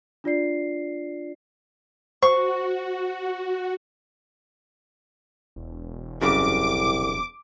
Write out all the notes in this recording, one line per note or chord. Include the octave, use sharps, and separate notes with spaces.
D4 F4 D5 C7
F#4 C5 C#6
E1
C2 F#2 C#3 D6